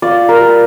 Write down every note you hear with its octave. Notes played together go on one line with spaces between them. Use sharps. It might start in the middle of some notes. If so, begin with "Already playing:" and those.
F4 D5
A#4
G3